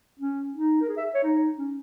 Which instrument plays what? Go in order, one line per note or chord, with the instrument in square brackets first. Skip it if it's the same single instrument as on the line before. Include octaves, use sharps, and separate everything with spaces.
[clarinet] C#4
D#4
A#4
G#4
E5
C#5
D#4
C#4